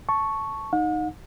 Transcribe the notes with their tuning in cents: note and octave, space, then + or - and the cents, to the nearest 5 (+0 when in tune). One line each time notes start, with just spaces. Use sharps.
A5 +0 C#6 +0
D#4 +0 F#5 -45